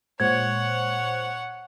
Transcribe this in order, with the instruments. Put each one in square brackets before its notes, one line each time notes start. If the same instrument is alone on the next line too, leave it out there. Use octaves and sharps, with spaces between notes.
[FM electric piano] A#2 G#3 C5 [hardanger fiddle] C#5 F#5 [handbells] G#6